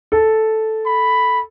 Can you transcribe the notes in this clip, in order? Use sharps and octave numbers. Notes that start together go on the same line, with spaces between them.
A4
B5